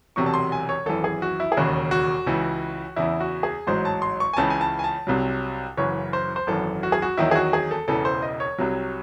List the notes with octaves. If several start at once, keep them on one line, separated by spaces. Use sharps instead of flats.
E1 E2 C3 F#3 C#6
A5
C6
G#5
C#5
G#1 F#2 E3 A4
G#4
F#4
E4
G#4
E1 D#2 C#3 F#3 F#4
F#4
C#2 C#3 E3
E2 C#3 E3 E4
F#4
G#4
A1 G#2 F#3 C5
A5
C6
C#6
G#5
C#2 C#3 E3 A5
G#5
A5
G#5
A5
C2 C3 F#3
F#1 F#2 C#3 E3 C#5
C5
C5
G#1 F#2 E3 A4
F#4
G#4
F#4
E2 D#3 F#3 E4
G#4
F#4
G#4
A4
E1 E2 C#3 E3 A4
C5
D#5
C#5
C2 C3 F#3